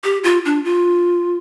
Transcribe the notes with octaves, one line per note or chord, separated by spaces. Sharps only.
G4
F4
D4
F4